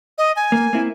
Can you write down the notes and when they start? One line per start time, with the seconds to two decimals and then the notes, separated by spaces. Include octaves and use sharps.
0.18 D#5
0.36 G#5
0.52 A#3
0.73 A#3 C4 E4